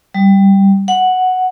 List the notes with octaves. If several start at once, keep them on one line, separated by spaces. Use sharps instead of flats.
G3
F#5